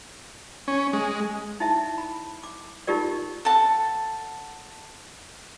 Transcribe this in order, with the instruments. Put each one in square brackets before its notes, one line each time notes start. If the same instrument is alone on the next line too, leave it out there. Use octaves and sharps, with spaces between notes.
[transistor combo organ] C#4
G#3
[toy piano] D#4 E4 E5 A5
B5
D6
D#4 F4 G4 A#4 D5
[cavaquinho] A4 F#5 A5